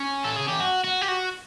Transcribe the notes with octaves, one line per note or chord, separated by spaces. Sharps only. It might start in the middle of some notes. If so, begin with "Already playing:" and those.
Already playing: C#4
A4
G#4
G4
F#4
F#4
G4
F#4